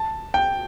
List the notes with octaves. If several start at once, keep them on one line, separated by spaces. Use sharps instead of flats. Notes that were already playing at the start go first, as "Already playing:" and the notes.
Already playing: A5
G5